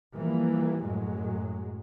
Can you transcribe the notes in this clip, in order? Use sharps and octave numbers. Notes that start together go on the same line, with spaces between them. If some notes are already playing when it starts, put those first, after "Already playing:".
E3 F3 G3 A#3
F#2 A2 F#3 G#3